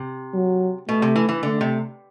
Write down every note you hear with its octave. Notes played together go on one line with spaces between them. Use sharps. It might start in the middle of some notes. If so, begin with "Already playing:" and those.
Already playing: C3
F#3
B2 A3
C3
E3
E3
D3 A3
C3